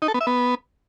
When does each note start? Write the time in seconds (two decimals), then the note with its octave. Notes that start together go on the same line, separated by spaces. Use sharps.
0.02 D#4
0.08 A4
0.14 B3
0.21 E5
0.27 B3